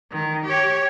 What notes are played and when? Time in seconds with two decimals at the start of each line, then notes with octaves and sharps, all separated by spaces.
0.12 D#3
0.46 G4 C#5